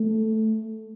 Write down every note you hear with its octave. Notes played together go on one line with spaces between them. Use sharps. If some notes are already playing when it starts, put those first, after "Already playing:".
Already playing: A3